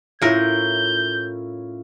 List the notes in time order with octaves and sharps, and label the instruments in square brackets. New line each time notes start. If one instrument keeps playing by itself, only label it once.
[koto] A2 A#4 [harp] C#4 E4 F4 [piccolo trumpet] G6